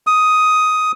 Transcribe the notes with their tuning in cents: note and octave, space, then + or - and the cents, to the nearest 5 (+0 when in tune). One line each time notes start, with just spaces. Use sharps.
D#6 +10